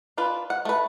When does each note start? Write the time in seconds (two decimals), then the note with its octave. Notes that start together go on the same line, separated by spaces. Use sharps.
0.18 D4 F4 B4
0.50 F#5
0.65 A3 B4